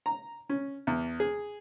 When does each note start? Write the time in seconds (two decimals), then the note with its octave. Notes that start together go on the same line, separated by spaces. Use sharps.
0.06 A#5
0.49 C#4
0.87 E2
1.20 G#4